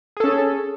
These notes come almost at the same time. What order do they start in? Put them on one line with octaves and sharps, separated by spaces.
G#4 A4 C#4